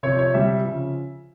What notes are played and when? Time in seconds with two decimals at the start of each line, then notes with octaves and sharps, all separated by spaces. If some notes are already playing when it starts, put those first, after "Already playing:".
0.03 C3 F3 C#5
0.19 C#5
0.34 C3 G3 E5
0.64 C#3 F3